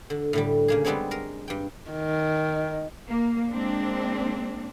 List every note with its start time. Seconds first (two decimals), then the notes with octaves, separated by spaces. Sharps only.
0.10 D3
0.33 A2 D3 G3
0.68 C#3 A#3 G#4
0.85 G3 G#3 B3 C4 D4 C#5
1.11 G#3 A#4
1.48 G2 G5
1.91 D#3
3.08 A#3
3.51 G#3 A#3 C4 D4